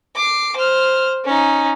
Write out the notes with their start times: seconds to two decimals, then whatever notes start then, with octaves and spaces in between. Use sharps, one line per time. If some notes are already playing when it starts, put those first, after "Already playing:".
0.16 D6 C7
0.57 C5 F6
1.25 C#4 D#4